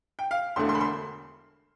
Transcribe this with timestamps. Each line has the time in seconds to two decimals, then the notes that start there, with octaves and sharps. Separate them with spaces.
0.19 G5
0.31 F5
0.56 E1 E2 D3 A3 C6
0.69 C6
0.75 B5
0.81 C6